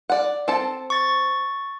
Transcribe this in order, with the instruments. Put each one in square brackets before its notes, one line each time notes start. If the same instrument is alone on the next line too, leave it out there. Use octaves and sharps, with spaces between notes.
[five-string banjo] D5 F#5
C4 A4 A5
[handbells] C#6 A6